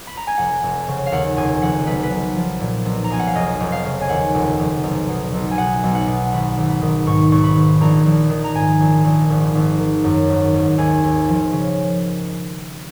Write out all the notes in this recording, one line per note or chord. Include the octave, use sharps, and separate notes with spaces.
B5
A#5
G#5
F1 F#5
F1
C#3
F5
D#2 F#5
F1 G#5
F1 F#5
B1 B4
B4
B1
F3
A#2
B1
A#5
B1 G#5
F#5
F5
F1 D#5
F1
F5
C#3
G#5
D#2 F#5
F1
F1
B1
B2
B1
G#5
B2 F#5
B1
F#5
B2
G#1 B5
G#1
B5
D#3
G#2 C#6
G#1 C#6
B5
G#1
A#1 A#5
A#1
D#3
A#5
G#2 G#5
A#1
A#1
G#1
G#1
D#3
F#2
G#1
G#1
D#2 G#5
D#2
F3
C#3